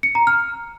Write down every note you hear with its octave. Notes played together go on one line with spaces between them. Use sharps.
C#7
A#5
F6